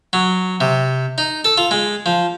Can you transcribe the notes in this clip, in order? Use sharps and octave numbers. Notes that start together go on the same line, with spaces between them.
F#3
C3
D#4
A4
F4
G#3
F3